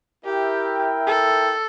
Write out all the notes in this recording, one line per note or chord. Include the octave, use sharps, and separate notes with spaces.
E4 G4 A#4 E5 G5
A4